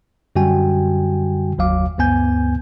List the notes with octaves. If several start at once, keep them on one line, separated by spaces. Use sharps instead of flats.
F#2 D3 G3 F#4 G5 G#5
G1 D#2 F#3 F5 D6
D2 G2 B3 G#5 G6